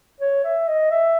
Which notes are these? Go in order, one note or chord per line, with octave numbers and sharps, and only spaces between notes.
C#5
E5
D#5
E5